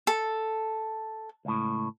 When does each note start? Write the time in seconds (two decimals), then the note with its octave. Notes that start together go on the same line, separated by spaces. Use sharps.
0.07 A4
1.45 C#2 A2